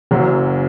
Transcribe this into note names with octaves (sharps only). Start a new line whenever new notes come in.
F#1 F#2 C#3 F#3